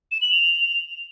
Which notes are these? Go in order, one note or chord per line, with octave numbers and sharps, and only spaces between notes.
E7
F#7
F7